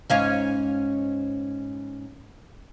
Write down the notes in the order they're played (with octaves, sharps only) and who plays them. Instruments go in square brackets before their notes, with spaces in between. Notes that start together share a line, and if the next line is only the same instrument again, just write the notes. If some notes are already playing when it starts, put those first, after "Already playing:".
[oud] G#2 C#4 F5